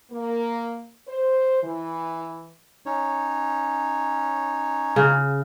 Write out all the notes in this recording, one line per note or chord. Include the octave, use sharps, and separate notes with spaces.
A#3
C5
E3
C#4 D#4 C#5
C#3